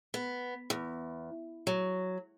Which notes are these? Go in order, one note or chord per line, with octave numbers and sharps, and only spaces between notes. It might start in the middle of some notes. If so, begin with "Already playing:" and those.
B3
E2
F#3